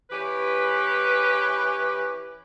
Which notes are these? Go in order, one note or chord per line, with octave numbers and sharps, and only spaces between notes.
E3 C#4 G4 B4